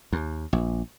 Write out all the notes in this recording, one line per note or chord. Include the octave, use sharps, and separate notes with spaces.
D#2
A#1